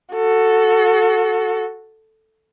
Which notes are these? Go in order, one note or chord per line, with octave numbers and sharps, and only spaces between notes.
F#4 A4